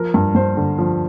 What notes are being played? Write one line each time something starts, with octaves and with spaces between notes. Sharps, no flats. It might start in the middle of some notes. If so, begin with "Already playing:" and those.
Already playing: F3 A#4
G2
G2 C5
D3
F3